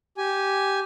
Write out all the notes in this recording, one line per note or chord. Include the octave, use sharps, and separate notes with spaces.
G4 G#5